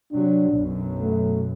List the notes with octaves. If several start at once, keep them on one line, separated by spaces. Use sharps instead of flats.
C3 F#3 D4
B1 F#2
A3